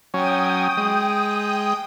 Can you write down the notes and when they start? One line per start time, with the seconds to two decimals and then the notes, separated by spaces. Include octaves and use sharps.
0.14 F#3 C#4 G5 D#6
0.77 G#3